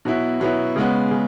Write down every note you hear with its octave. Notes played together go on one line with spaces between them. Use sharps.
B2 F#3 B3 E4
B2 F#3 B3 E4
C#3 G#3 B3
C#3